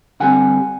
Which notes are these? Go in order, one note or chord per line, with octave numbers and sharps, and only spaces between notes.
D3 G3 C4 F#5 G#5